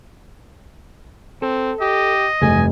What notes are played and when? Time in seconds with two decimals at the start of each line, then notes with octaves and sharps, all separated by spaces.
1.42 C4 A4
1.81 G4 D#5
2.41 F1 G2 C3 E3 G#5